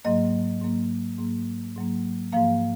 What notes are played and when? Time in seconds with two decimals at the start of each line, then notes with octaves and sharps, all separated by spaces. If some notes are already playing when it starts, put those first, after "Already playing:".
0.05 G#2 F#3 A#3 D#5
0.61 G#2 F#3 A#3
1.18 G#2 F#3 A#3
1.76 G#2 F#3 A#3
2.33 G#2 F3 A#3 F5